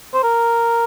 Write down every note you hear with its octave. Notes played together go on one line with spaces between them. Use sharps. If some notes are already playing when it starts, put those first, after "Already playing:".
C5
A#4